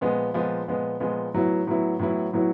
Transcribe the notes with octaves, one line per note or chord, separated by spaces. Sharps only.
A#2 F3 G#3 B3
A#2 F3 G#3 B3
A#2 F3 G#3 B3
A#2 F3 G#3 B3
A2 F#3 B3 E4
A2 F#3 B3 E4
A2 F#3 B3 E4
A2 F#3 B3 E4